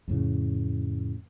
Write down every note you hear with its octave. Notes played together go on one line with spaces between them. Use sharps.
F2 A2 C#3